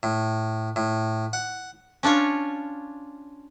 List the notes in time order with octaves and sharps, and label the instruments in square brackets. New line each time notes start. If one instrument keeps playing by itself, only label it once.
[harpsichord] A2
A2
F#5
[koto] C#4 D4 F4 C#5